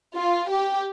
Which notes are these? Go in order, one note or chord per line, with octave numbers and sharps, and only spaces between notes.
F4
G4